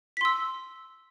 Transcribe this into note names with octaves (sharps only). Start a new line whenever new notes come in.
C6 E6 B6